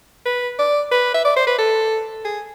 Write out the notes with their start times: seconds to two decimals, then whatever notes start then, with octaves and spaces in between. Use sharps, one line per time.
0.26 B4
0.59 D5
0.92 B4
1.14 E5
1.25 D5
1.37 C5
1.47 B4
1.59 A4
2.25 G#4